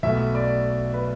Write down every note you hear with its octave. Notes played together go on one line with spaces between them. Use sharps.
B1 B2 A3 E5
D5
B4